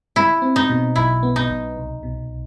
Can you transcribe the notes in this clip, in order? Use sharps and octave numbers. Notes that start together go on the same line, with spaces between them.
G3 E4
C4
D#4
B2
B1 E4
B3
D#4
B1
C2
B2